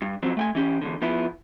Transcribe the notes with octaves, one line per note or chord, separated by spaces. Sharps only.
G2
F3 F#3 C4
A3 G5 G#5
E3 C#4 G4
E2 G#2 D3
F3 B3 E4